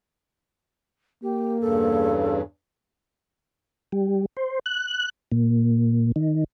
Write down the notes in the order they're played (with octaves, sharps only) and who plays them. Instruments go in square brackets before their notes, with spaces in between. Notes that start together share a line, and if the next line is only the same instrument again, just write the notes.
[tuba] A#3 [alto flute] G4
[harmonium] E2 G2 C#3 [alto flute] A4
[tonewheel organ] G3
C5
F#6
A#2
D#3